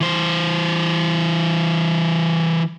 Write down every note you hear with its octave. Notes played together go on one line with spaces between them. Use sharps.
E3 C5